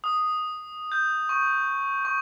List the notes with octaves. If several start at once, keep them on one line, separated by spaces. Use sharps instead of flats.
D#6
G6
C#6
C#6